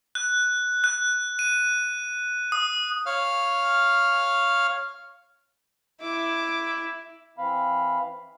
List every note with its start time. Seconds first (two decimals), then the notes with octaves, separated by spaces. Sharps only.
0.15 F#6
0.84 F#6
1.39 D#7
2.52 D#6
3.06 C#5 F5 F6
6.02 E4 D6
7.38 E3 C4 F5 B5